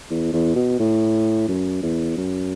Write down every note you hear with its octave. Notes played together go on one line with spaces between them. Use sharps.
E2
E2
B2
A2
F#2
E2
F#2